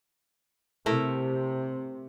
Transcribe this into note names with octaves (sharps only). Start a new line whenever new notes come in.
C3 A3 E4 A#4